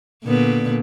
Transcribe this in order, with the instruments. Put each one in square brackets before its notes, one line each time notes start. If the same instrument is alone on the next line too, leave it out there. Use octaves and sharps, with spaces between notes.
[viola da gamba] A#2 D3 B3